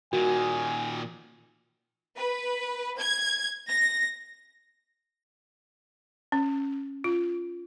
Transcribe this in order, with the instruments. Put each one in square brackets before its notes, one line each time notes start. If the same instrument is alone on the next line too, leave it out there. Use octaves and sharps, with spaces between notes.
[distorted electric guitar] A#2 D#3 [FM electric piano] F#4 [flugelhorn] G#5
[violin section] B4
G#6
A#6
[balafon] C#4
F4